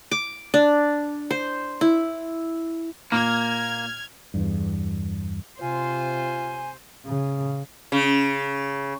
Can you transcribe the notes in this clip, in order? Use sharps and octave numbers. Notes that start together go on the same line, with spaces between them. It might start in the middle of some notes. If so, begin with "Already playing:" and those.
D6
D4
C5
E4
A#2 A#3 F6 G#6
E2 G2
C3 F4 C5 G#5
C#3
C#3